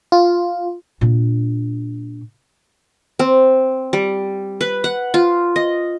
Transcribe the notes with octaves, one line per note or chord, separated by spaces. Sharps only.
F4
A#2 D4
C4
G3
B4
F#5
F4
D#5